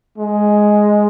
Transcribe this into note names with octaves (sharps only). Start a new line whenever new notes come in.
G#3